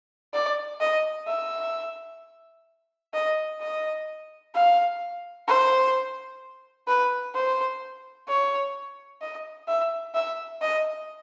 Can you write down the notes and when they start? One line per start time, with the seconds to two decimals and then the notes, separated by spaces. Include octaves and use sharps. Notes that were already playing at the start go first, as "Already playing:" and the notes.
0.34 D5
0.80 D#5
1.28 E5
3.14 D#5
3.61 D#5
4.54 F5
5.48 C5
6.88 B4
7.34 C5
8.28 C#5
9.22 D#5
9.68 E5
10.15 E5
10.62 D#5